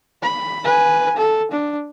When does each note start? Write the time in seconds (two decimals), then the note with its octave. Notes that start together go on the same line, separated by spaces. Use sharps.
0.22 B5
0.65 B4 G#5
1.17 A4
1.52 D4